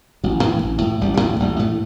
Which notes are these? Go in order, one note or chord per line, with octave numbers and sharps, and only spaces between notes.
A1 F#3
A2 E3
A1
A2
A1 G3
G3
A2
A1 G3
A2 A3